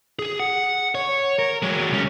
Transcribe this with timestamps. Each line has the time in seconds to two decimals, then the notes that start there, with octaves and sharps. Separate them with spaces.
0.19 G#4
0.40 F#5
0.95 C#5
1.39 A#4
1.62 F#3 G#3
1.90 C2 C#4